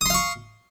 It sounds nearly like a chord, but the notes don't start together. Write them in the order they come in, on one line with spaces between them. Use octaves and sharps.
D#6 C6 F5 C#6